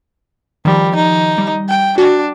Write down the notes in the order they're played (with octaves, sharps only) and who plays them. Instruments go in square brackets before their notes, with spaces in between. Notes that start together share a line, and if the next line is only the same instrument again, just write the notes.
[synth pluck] D#3 F3 [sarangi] G3
[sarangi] D#4
[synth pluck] G3
[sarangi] G5
[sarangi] D4 [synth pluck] F#4